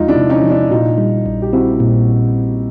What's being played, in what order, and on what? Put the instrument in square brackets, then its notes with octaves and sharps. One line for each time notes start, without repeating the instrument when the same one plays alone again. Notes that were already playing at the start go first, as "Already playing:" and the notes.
Already playing: [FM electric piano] E2 F3 G#3 [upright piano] D#4 F4
[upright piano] D4 E4
[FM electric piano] C3
[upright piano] C#4 D#4
[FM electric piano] F3
[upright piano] D4 E4
[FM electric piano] A#2 [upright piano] D#4 F4
[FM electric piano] G3
A#1
[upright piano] G4
[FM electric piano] C4 [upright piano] E4 F#4
[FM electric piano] A#2